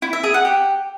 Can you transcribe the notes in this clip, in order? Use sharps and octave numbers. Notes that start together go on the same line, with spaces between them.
E4
E5
G#4
F#5
G4